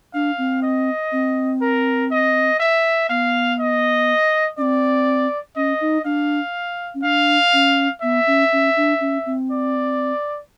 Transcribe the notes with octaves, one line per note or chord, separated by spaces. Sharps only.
D4 F5
C4
D#5
C4
A#4
D#5
E5
B3 F5
D#5
C4 C#4 D5
C#4 D#5
D#4
D4 F5
C#4
D4 F5
C#4
B3 E5
C#4
C#4
D4
C#4
C4
D5